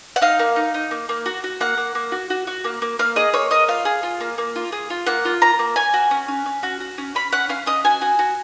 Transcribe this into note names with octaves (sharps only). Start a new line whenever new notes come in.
F#5
D#4 F5
A#3
D#4
D#4
A#3
A#3
F#4
F#4
A#3 F#5
A#3
A#3
F#4
F#4
F#4
A#3
A#3
A#3 F5
G#4 D#5
A#3 C#5
A#3 D#5
F4 F5
G#4
F4
A#3
A#3
F4
G#4
F4
A#3 F#5
F4
A#3 A#5
A#3
C#4 G#5
F#4
C#4
C#4
C#4
F#4
F#4
C#4
C#4 B5
C#4 F#5
C#4 F5
C#4 D#5
F#4 G#5
F#4
F#4